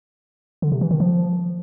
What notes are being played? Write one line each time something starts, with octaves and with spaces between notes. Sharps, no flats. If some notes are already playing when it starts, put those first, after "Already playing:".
D3
C3
E3
D#3
F3